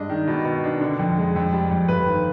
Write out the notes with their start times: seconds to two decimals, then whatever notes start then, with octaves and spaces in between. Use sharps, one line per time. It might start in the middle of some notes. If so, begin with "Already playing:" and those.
Already playing: G2 G#3 D4 D#5
0.09 D#3
0.27 B2
0.45 B2
0.64 D4
0.81 D3
0.99 F2
1.18 G#3
1.36 F2
1.53 G3
1.71 F2
1.88 G1 B4
2.06 D#3